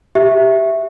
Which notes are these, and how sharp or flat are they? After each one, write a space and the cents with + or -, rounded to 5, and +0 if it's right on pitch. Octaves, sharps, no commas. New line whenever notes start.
G4 -5 E5 +0